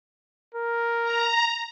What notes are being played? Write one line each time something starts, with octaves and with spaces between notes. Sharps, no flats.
A#4
A#5